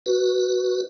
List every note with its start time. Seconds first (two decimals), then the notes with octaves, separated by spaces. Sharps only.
0.06 F#4 B4